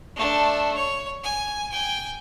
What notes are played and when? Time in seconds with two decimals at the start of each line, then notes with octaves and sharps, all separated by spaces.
0.16 A3 D4
0.76 C#5
1.24 G#5
1.70 G5 G#5